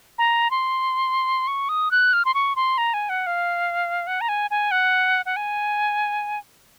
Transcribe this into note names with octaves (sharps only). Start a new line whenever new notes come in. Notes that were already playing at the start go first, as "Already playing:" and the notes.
A#5
C6
C#6
D#6
F#6
F6
C6
C#6
C6
A#5
G#5
F#5
F5
F#5
A#5
G#5
G#5
F#5
F#5
G#5